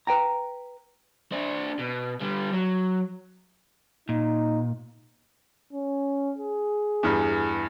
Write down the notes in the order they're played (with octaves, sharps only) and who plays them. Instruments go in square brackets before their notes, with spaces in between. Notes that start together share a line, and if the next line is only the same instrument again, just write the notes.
[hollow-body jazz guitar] B4 G5 A#5
[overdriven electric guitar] D4 C5
B2
D3 G3
F#3
[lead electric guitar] A#2 [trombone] D#4
[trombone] C#4
G#4
[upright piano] E2 G2